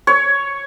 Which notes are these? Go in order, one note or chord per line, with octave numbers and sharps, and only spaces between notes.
C#5